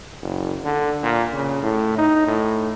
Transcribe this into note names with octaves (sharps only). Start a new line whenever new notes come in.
F#1
D3
A#2
C#3
A2
D#4
A2